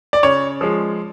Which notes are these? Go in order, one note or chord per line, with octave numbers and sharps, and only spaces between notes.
D5
C#3 C#5
F3 G#3